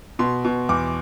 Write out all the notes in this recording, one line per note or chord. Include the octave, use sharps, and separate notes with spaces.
B2 C6
B2
E2 D6